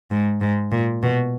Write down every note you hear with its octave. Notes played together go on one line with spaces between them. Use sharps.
G#2
G#2
A#2
B2